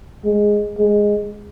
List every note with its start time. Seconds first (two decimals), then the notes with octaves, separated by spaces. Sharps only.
0.25 G#3
0.78 G#3